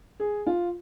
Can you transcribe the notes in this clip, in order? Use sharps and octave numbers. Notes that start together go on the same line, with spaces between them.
G#4
F4